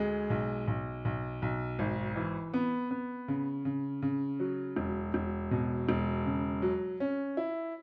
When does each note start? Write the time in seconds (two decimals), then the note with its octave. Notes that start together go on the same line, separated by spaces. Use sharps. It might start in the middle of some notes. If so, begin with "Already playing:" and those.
Already playing: D2 G#3
0.30 B1
0.68 B1
1.05 B1
1.42 B1
1.79 G#1
2.16 E3
2.54 B3
2.91 B3
3.28 C#3
3.65 C#3
4.02 C#3
4.40 F#3
4.76 E1
5.14 E1
5.51 B2
5.89 E1
6.26 C#3
6.62 F#3
7.00 C#4
7.37 E4